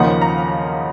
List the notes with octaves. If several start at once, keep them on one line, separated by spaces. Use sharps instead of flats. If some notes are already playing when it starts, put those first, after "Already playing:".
Already playing: D#2 C#3 F3 A#3 D#4 F#5
A#5